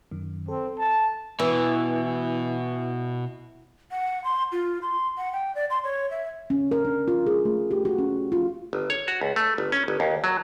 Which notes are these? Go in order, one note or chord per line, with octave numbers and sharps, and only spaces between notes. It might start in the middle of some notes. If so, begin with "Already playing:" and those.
F#2 D#3
C4 A4
A5
B2 E3
F#5
C6
F4
C6
F#5
G5
D5
C6
C#5
E5
C#4
A#4
D4
F4
G#4
A3
G4
F#4
C#4
F4
G1
C#5
F#4
C#2
A3
G1
C#4
G1
D#2
F#3